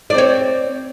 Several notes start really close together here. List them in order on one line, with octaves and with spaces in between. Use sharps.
D5 C4 C#5